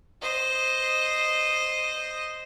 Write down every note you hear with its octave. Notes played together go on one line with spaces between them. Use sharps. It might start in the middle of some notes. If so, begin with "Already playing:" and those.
C5 D#5